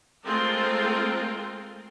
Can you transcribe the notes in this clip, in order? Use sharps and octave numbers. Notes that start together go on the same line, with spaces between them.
G#3 A3 C4 F4 A#4